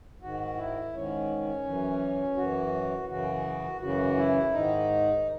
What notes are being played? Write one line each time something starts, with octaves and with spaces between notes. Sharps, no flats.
G#2 D#3 F#4
E4
G#2 D#3 C#4
F#2 E3
F#2 E3 F#4
F#2 C#3 E3 F#4
F#2 C#3 E3 F#4
E4
G#2 D#3 D#4